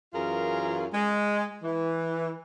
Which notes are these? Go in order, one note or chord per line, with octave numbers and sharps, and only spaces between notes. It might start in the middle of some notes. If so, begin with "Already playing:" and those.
F#2 E3 F4 G#4 A#4
G#3
E3